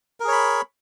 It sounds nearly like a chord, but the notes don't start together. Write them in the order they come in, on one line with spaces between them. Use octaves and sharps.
A#4 G#4 C#5 B5